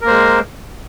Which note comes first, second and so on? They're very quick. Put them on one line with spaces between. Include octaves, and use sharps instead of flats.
A#4 A#3 C5 G#3